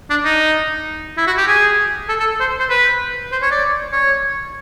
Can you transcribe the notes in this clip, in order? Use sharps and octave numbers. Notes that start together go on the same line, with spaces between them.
D4
D#4
E4
F#4
G4
G#4
A4
A4
C5
C5
B4
C5
C#5
D5
C#5